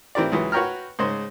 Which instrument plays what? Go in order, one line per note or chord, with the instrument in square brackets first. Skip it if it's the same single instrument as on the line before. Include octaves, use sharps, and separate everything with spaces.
[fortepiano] E3 C4 G4 A#4 D5
C#2 C#3 E3 F#3
F#4 B4 C#5 G5 A#5 F6
G#2 C#3 G#3 C5